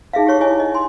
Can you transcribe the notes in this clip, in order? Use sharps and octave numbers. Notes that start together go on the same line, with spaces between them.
D#4 G#4 E5 F5
G4 G#4 C#5 C#6
E4 G#4 C#5 D#5 G#5
D#5
G#5 C6